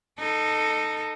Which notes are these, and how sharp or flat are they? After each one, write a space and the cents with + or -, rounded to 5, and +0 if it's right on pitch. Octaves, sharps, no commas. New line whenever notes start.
D#4 -15 A4 +10